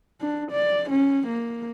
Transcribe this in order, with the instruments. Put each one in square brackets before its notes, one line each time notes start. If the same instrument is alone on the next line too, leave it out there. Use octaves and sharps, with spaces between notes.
[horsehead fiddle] D4
D5
C#4
A#3